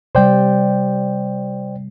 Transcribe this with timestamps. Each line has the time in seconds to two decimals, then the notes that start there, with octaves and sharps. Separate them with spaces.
0.15 C3 G3 C5 D5 G5